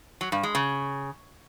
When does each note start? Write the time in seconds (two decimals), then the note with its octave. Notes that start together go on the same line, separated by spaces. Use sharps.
0.21 F#3
0.32 G2
0.43 G#3
0.55 C#3